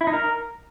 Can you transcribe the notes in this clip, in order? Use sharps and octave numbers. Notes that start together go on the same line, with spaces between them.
E4
D#4
A#4